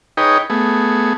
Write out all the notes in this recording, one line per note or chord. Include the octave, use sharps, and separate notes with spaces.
D#4 G#4 B4 C#5 D#5 G5
A3 B3 G#4